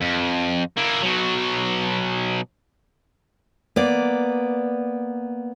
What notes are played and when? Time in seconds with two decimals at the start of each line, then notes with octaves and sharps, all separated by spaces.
0.01 F2
0.77 A#3 E4
1.02 B2 F#3
3.76 A#3 B3 D5